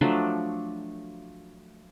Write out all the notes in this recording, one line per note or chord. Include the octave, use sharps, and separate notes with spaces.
F3 F#3 A3 D4